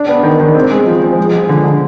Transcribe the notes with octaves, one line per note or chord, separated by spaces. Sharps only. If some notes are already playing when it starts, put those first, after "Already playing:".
Already playing: D4
B3
D#3
D#3
C4
G#3
F3
F3
G#3
F3
D3
D3